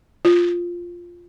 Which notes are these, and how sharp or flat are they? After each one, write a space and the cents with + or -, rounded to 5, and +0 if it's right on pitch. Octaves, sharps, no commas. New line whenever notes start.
F4 +0